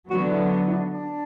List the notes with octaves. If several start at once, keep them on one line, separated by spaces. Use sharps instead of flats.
D3 F#3 B3 F#4
E4
D4
E4
D4
D4